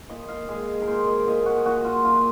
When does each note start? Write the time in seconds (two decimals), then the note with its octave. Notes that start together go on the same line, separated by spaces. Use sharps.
0.09 A#2 D#5
0.28 F5
0.48 G#3 G#4
0.82 A#4
0.87 A#2 C5
1.07 D#5
1.27 A#2 D#5
1.46 F#4
1.65 A#2 F#4
1.85 F4
2.04 A#2 F4